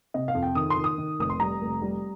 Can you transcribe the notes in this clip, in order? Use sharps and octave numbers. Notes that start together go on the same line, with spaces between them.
C3 D#5
F5
F2
G5
D#3 D#6
C6
D#3
D#6
D#3
F1 D#6
C6
G3 A#5
F1
G3